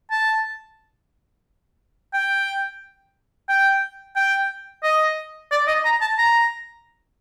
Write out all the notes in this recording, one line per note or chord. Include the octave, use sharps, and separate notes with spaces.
A5
G5
G5
G5
D#5
D5
D#5
A#5
A5
A#5